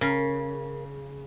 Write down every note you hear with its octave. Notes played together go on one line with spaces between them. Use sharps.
C#3 A#4